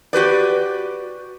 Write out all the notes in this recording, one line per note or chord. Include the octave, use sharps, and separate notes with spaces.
F#4 G4 B4 D5